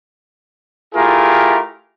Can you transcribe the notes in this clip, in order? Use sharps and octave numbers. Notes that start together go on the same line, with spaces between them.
A3 E4 F4 G4 G#4 A#4